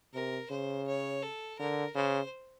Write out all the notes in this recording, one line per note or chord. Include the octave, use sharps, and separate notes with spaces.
C3 A#4
C#3 C5
C#5
A4
D3 A#4
C#3 C5